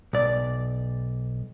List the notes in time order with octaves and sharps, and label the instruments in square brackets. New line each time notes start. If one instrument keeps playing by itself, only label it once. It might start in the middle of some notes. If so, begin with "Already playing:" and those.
[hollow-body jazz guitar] B1 D5